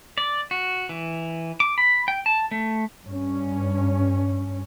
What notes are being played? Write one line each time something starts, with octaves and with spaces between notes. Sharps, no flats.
D5
F#4
E3
D6
B5
G5
A5
A3
G2 C#4